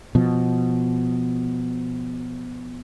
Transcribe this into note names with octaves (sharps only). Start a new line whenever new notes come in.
B2 F3